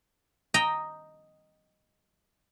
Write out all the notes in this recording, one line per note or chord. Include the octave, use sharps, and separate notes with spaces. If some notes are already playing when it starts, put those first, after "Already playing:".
D#5 G5 A#5